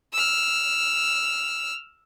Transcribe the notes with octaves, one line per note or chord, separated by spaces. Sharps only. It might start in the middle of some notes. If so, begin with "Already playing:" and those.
E6 F6